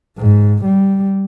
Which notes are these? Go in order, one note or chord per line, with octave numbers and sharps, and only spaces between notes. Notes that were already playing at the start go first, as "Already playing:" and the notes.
G#2
G3